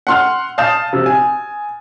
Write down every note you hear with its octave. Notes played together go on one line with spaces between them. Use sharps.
F#5 C6 F6
F5 A5 D#6 G6 A6 E7
C3
G#5